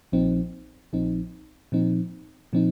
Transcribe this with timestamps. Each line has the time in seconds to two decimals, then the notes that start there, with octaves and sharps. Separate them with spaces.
0.12 A#1 A#2 F3 C4 D#4
0.93 A#1 A#2 F3 C4 D#4
1.72 A#2 F3 C4 D#4
2.53 A#2 F3 C4 D#4